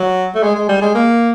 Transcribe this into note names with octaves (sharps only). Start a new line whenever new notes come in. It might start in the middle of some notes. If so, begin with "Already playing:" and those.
Already playing: F#3
A3
G#3
G#3
G3
G#3
A#3